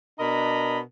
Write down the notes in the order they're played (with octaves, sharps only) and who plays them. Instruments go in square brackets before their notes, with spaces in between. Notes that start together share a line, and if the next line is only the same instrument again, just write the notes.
[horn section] B2 D4 A#4 D#5 A#5 B5